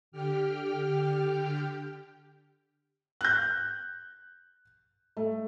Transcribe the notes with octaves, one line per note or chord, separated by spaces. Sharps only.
D3 G4 G5 F6
F#6 G6
A3